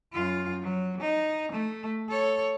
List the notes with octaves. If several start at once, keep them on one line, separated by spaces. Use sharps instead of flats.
F#2 F4
F#3
D#4
A3
A4 C#5